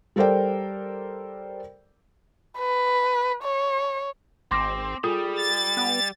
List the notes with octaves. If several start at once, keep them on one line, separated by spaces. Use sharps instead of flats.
G3 A4 A#4 C5 D5 G5
B4
C#5
G#1 C4 C6 D6 A#6
G3 F4 G#4 A4 D#6
A6
B3